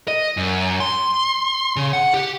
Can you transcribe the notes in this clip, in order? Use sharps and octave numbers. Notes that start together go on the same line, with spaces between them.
D#5
F#2
C6
C#3
F#5
G4